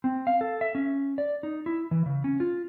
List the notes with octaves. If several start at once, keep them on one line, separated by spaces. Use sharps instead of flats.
C4
F5
A4
E5
C#4
D5
D#4
E4
E3
C#3
C#4
F4